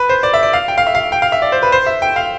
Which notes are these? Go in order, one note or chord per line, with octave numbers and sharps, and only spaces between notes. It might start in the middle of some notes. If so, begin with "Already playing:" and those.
Already playing: B4
C5
D5
E5
D5
F5
G5
F5
E5
F5
G5
F5
E5
D5
C5
B4
C5
E5
G5
F5